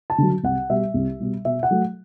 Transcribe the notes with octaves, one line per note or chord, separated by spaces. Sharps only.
A5
D3 F#3
C2 F#5
B2 G3 E5
C2
B2 G3
B2 E5
F#5
F#3 A3